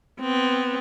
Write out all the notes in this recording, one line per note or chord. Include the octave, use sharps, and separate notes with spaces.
B3 C4